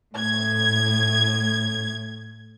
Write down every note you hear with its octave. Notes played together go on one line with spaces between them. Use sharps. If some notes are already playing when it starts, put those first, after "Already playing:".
A2 G#6